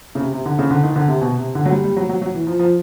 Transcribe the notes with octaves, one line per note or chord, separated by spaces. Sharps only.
C#3
C3
C3
D3
C#3
D3
D#3
D3
C3
B2
C3
D3
F#3
G3
G3
F#3
F#3
F#3
E3
F3
F3